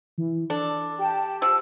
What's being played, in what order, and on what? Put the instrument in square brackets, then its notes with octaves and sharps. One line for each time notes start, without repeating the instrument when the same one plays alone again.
[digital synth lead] E3
[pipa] D4 [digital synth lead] A4
[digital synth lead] G4 [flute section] G5 A5
[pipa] F3 [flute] E6